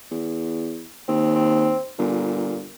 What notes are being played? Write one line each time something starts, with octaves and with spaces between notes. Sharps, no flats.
E2
D#2 C4
C4
G1 A#2